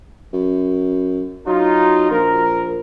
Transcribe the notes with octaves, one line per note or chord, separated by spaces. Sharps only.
F#2
F#3 D#4 F4
A#1 A#4